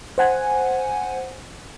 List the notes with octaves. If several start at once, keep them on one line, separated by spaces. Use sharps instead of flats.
C5 F#5 G#5